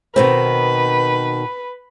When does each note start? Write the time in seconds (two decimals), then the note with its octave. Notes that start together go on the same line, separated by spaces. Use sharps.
0.16 B2 D#3 C4 B4